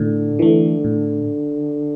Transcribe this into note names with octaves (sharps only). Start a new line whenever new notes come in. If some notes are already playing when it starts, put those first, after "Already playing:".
Already playing: A2 D3
E3 A3
A2